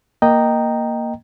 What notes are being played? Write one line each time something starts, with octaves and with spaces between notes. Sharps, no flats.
A#3 D#5 G5 A#5